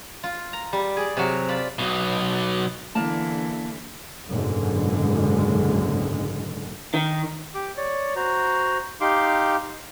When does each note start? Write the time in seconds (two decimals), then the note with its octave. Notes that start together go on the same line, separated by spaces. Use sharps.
0.23 F4
0.53 A#5
0.73 G3
0.97 G#4 D5
1.17 C3 F#3
1.49 F4 D5 B5
1.79 B1 B2
2.95 E2 D3 E3 A#3 A5
4.28 F#1 B1 G#2 D3 G#3
6.94 D#3
7.55 G4 D6
7.77 C#5 D5
8.16 F#4 C5 A#5
9.01 D#4 G4 F5 C6 D6